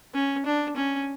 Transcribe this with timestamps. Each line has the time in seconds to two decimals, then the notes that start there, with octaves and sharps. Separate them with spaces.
0.15 C#4
0.46 D4
0.77 C#4